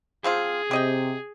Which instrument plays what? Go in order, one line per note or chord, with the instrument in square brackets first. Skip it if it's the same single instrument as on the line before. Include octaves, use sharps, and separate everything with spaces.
[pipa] F3 C4 F4 [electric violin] G#4
[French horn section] C3 [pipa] G4 D#5 G5